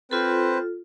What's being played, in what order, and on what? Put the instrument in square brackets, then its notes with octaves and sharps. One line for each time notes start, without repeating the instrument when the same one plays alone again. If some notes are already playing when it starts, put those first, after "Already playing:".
[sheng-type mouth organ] C4 B4 C5 [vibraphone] F4 A4